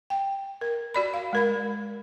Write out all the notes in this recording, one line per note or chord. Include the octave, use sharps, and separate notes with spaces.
G5
A#4
F#4 D5 B5
F5
G#3 A#4 B5